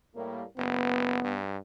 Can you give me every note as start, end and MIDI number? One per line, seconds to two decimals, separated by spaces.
0.16 0.45 45
0.16 0.45 55
0.16 0.45 58
0.58 1.20 30
0.58 1.38 59
1.24 1.58 43